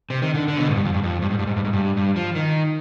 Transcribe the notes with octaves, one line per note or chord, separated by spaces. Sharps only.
C3
D#3
D3
D3
B2
G#2
G2
F2
G2
F2
G2
G#2
G2
G#2
G2
G#2
G2
G2
F3
D#3